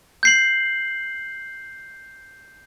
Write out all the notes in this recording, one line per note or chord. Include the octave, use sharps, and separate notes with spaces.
G6 C7 F#7